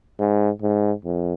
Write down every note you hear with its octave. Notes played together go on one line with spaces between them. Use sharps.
G#2
G#2
F2